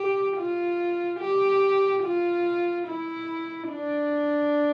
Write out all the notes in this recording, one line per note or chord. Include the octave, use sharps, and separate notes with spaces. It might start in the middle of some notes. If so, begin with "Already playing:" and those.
Already playing: G4
F4
G4
F4
E4
D4